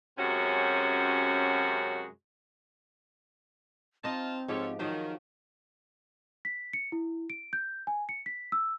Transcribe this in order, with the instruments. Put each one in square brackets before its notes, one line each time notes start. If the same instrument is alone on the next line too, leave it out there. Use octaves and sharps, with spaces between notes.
[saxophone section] F#2 C3 G#3 C#4 F#4
[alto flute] C4 [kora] D#4 D#5 [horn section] F4 A5
[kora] G#2 F3 G4 [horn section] F4 A4 C#5
[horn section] D#3 [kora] F3 F#3 C5 [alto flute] D#4
[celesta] B6
C#7
E4
D7
G6
G#5
C#7
B6
E6